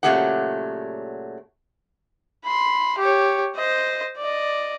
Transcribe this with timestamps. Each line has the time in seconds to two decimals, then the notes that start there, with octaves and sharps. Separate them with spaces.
0.03 A#2 C#3 F#3 A3 G4 F#5
2.44 B5 C6
2.98 G4 C#5
3.56 C5 D#5
4.17 D5 D#5